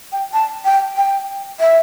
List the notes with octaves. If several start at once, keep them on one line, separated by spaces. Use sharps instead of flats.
G5
A5
G5
G5
E5